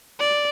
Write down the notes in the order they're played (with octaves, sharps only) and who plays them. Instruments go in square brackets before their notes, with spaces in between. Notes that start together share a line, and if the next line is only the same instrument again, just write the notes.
[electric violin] D5